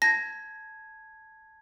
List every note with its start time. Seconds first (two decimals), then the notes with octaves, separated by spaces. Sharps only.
0.02 A5 G#6 A#6